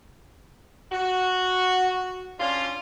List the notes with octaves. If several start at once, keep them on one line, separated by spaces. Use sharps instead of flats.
F#4
C#4 D4 F4